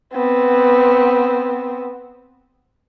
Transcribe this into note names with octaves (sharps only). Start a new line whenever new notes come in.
B3 C4